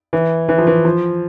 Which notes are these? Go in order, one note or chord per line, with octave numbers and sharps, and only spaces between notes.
E3
E3
F3
E3
F3